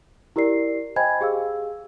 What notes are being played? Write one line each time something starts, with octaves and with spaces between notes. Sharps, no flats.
E4 G4 A#4 D5 C7
C5 D#5 G5 G#5 B5 G#6
G4 G#4 F5 E6